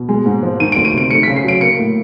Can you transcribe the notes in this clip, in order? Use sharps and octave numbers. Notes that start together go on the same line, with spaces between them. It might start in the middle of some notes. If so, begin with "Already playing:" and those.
Already playing: B2
G#3
G#2
F3
D#3 D#7
D2 D7
D#7
C3 D7
A3 C#7
C#3 B6
C7
F#3 D7
A#3 C#7
A2